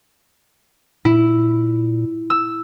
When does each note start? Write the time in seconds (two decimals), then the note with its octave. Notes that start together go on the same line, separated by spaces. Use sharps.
1.05 A#2 E4
2.30 E6